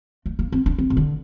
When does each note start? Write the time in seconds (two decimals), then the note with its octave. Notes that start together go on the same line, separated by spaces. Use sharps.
0.26 A3
0.39 A#3
0.52 C4
0.66 D4
0.78 C4
0.90 C3
0.97 D3